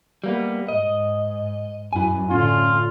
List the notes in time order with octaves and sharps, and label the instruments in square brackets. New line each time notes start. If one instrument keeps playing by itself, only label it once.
[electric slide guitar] G3 A#3 B3
[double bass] G#2 [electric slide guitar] D#5
[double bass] F#2 [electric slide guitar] E4 G#5
[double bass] A2 D3 [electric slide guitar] C#4 [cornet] F4